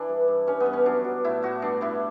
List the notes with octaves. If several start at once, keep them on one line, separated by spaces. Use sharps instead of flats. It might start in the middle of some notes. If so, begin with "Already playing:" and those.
Already playing: E3 D4 E4
G2
G2
G2 C#4
B3
G2
C#4
F#3 D4
F#3
A2 E4
A2 F#4
G2 D4
G2 E4